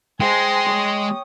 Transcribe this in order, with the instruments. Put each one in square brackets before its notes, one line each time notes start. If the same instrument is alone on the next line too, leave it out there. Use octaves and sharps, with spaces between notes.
[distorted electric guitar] G#3 [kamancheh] C5 G#5 [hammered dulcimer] G5 [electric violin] C6 A#6
[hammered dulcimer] C#5 [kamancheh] D#6